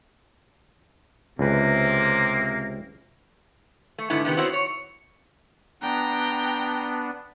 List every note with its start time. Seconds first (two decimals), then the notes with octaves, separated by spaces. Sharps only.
1.39 C#2 C3 A#3 B4
3.98 A3
4.10 G#2 D3 B3 E4
4.25 C3 D#3 B3 G4
4.37 B3 C4 E4 F#4 C5 C#5
4.53 C#5
5.82 B3 D4 G5 A#5